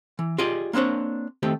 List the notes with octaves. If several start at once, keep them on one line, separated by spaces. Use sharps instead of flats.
E3
F4 G4 G#4 D5 D#5
A#3 C4 D4 C5 C#5
D#3 A3 C4 G4